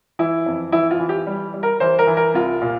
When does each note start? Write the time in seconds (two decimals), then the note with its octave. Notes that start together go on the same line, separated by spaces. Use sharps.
0.19 E3 E4
0.46 F2
0.72 E3 E4
0.91 F4
1.00 E3
1.09 G4
1.27 G3
1.54 G3
1.63 A#4
1.80 E3 C5
1.99 A#4
2.07 E3
2.17 A#4
2.34 C2 F4
2.62 A#2